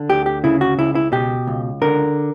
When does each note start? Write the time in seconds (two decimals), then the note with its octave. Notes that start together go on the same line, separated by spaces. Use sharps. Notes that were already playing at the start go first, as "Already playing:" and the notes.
Already playing: D3
0.09 D2 G4
0.26 G4
0.44 C#3 E4
0.61 F#4
0.78 C#2 E4
0.95 E4
1.12 B2 G4
1.47 C#2
1.82 D3 A#4